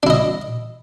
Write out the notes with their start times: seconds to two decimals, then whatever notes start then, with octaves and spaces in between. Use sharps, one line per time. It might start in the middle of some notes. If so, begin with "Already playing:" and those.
0.03 D4
0.07 E4
0.10 D#5